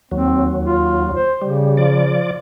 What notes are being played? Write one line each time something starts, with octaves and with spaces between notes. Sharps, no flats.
D#2 F#3 C4
F4
C5
C#3 G3
F3 D5